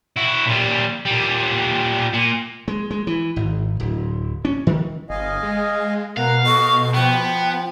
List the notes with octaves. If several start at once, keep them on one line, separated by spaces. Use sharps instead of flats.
E4 F#4
A#2 G3
A#2 G3
A#2
G#3
G#3
E3
G#1
D1
C#4
D#3
G1 D#5 F5 G#5
G#3
B2 A#4 F5 F#5
A4 D#5 C#6
F3 B3 G5